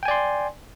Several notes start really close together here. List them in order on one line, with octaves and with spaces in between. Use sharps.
G5 G#5 D5 C6